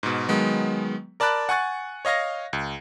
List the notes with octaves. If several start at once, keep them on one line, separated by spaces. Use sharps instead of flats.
G#2 B2
D#3 F#3 G#3 B3
A#4 D5 A5 B5 F#6 A6
F#5 G#5 C#6 F#6 A6
C#5 D#5 F5 C#6 A#6
C#2